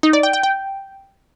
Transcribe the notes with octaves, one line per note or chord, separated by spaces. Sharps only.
D#4
D5
G5
G5
G5